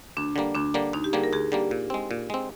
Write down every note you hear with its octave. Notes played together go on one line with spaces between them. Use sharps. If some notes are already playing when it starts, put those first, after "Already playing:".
D2 D4
D3 G3 A#3
D2 D4
D3 G3 A#3
D2 D#4
G4
D3 G3 A#3 G#4
A#4
D2 G#4
D3 G3 A#3 G4
A#2
G#3 C4
A#2
G#3 C4